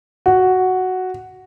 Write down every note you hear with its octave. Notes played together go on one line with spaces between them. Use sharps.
F#4